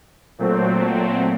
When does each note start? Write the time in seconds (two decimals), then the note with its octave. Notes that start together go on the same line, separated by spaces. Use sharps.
0.38 A#2 F#3 A3 C4